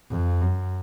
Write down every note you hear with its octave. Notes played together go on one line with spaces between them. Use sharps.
F2
F#2